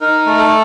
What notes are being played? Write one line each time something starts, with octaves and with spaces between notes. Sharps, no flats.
D#4 A#4
A3
A4